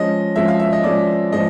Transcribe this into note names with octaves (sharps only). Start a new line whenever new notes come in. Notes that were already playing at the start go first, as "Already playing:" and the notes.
Already playing: F3 G#3 C#4 D#5
F3 G#3 C#4 E5
F5
E5
D#5
F3 G#3 C#4 D5
F3 G#3 C#4 D#5